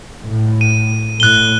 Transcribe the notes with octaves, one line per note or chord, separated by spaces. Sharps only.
A2
D#7
A2 F#6 G7